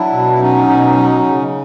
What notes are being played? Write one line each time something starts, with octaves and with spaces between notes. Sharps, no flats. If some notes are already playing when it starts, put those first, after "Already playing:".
Already playing: F#3 D4 E4
B2
E4
F#3 C#4 D#4
B2
F#3
C#3